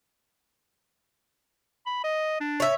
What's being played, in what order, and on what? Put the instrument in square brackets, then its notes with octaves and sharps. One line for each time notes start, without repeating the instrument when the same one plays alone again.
[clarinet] B5
D#5
D4
[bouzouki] C#5 E5